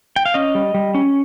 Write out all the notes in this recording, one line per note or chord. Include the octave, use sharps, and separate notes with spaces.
G5
F5
C#4 D#5
G3
G3
C#4